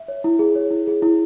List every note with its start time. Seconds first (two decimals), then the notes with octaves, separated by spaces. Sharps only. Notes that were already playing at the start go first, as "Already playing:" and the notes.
Already playing: E5
0.08 C#5
0.24 E4
0.39 G#4
0.55 C#5
0.71 E4
0.87 G#4
1.02 E4